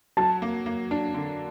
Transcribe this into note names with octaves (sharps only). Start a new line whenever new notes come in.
F#3 A5
A#3
A#3
D4
D3